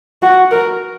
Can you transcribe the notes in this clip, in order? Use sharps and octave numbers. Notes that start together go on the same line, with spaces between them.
F#4
A#4